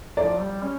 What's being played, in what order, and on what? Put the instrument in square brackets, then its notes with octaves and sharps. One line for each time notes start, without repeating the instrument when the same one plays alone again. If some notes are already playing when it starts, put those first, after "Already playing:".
[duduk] F3 [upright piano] D5
[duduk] G3
C#4